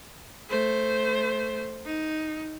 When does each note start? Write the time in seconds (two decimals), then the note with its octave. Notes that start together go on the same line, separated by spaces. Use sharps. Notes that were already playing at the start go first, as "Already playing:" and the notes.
0.50 A3 C5
1.85 D#4